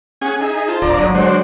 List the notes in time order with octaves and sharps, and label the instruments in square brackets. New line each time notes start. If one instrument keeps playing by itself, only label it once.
[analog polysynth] C#4 F#5 [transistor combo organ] G#4 G#5
[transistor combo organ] D#4 G#4 [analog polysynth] E5 G#5
[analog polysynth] F4 C5 A5
[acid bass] D1 [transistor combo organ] D3 D5 A#5
[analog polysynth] G1 D#7 [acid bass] F#3
[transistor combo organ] D3 F#4 C5 [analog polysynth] G#3 D7